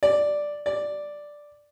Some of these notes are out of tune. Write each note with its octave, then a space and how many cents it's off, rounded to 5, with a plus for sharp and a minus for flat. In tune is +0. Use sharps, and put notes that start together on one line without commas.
D5 +0
D5 +0